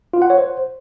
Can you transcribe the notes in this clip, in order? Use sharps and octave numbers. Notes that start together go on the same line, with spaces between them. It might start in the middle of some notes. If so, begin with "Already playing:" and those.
F4
F#5
C#5
C5